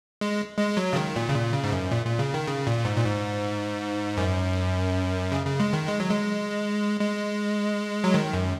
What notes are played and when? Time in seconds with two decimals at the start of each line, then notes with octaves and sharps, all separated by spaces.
0.21 G#3
0.58 G#3
0.77 F#3
0.93 C#3
0.96 D#3
1.16 A#2
1.29 C#3
1.34 A#2
1.53 C#3
1.64 G#2
1.72 F#2
1.91 A#2
2.05 A#2
2.19 C#3
2.34 D#3
2.47 C#3
2.67 A#2
2.85 G#2
2.97 A#2
3.05 G#2
4.17 F#2
5.32 C#3
5.45 C#3
5.60 G#3
5.73 D#3
5.87 G#3
6.00 F#3
6.11 G#3
7.01 G#3
8.04 F#3
8.14 D#3
8.33 F#2